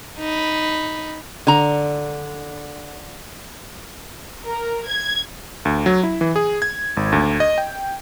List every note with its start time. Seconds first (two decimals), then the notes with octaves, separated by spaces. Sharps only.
0.19 D#4 B5
1.47 D3 A#5
4.45 A#4
4.88 G#6
5.65 D2
5.86 F#3
6.03 E4
6.21 E3
6.36 G#4
6.62 G#6
6.97 G#1
7.12 D2
7.40 D#5
7.58 G5